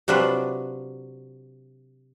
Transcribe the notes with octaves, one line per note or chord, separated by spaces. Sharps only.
C3 F#3 D4 F4 B4